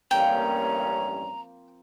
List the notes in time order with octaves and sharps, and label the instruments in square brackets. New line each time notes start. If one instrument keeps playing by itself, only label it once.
[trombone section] A1 G2 C#4 [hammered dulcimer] F3 A#3 C4 [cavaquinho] G5 [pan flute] A#5